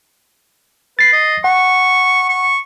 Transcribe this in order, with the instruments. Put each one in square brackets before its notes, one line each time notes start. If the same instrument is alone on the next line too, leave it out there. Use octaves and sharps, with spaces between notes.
[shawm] B4 [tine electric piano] A6 C7
[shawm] D#5
[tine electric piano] F#5 [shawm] C#6
[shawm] C#6